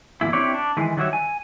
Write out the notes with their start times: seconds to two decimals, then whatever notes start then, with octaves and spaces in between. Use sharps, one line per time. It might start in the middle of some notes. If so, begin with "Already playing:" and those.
0.21 E2 A#2 C#3 G#3 E4
0.33 C4 D4 E4 G4 C#5 D5
0.54 D4
0.77 D#3 E3 G#3
0.97 D#3 F#3 G3 F#4 C#5 E5
1.13 G#5